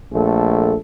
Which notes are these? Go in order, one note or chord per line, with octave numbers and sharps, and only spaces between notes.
A#1 A3 A4